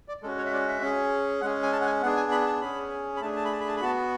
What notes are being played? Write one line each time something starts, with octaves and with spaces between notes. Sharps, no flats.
D5
G#3 C#4 F#4 A4
C#5
E5
D5
E5
C#4 G#4
G#3 C#4 G#4 F#5
G#5
A5
F#5
G#5
B3 D4 G#4 F#5
G#5
B5
A5
C#4 G#4 B5
B5
A3 D4 G#4 A5
A5
B5
A5
B5
A5
B5
B3 F#4 A5